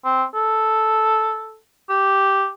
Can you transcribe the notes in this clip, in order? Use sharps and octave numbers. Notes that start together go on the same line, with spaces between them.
C4
A4
G4